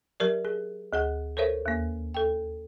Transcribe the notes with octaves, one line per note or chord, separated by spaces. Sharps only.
F#3 G4 A#4 D5
G#4
D2 G#4 F#5
A4 A#4 C5 C#5 E5
D#2 A#3
A4 G5